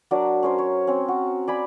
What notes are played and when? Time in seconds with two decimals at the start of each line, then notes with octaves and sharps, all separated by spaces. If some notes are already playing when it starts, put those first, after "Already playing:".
0.11 F#3 D4 A#4 D5
0.43 C#4 A#4 C5
0.58 C#5
0.87 C4 C#4
1.08 F#4
1.48 D5 G#5 B5